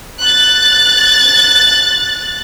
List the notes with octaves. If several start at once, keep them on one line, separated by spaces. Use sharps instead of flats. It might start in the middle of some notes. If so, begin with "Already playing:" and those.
F#6 A6